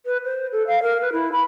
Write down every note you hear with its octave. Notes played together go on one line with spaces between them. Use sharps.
B4
C5
A4
F5
A#4
B4
E4
B5